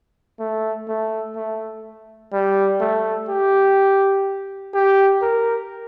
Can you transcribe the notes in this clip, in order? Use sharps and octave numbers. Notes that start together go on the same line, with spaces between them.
A3
A3
A3
G3
A3
G4
G4
A#4